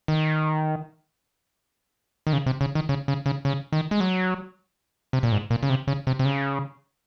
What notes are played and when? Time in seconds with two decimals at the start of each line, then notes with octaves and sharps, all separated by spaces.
0.08 D#3
2.27 D#3
2.33 C#3
2.46 C3
2.61 C#3
2.75 D#3
2.89 C#3
3.08 C#3
3.26 C#3
3.45 C#3
3.73 D#3
3.91 G#3
4.00 F#3
5.13 C3
5.23 A#2
5.32 G#2
5.50 A#2
5.63 C#3
5.70 C3
5.87 C#3
6.07 C3
6.19 C3
6.25 C#3